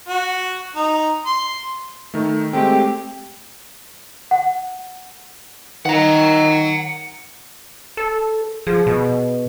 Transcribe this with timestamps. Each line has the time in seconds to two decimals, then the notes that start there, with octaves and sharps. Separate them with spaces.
0.09 F#4
0.76 D#4
1.26 C6
2.14 D#3 A3
2.53 G#3 A3 C4 G4
4.31 F#5
5.85 D#3 F#5 A#5
7.97 A4
8.67 F3 G#4
8.86 B2